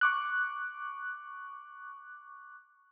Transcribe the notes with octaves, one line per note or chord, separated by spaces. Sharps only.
C#6 D6 F#6